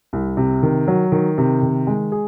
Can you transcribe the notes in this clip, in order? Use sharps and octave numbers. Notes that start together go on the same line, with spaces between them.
C2
C3
D#3
F#3
D#3
C3
D#3
G#3
G#4